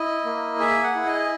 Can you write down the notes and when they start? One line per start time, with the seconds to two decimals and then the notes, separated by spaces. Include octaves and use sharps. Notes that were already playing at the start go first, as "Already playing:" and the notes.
Already playing: E4 D#5
0.25 A#3
0.60 G#4 E5
0.83 F#5
0.95 E4
1.06 D#5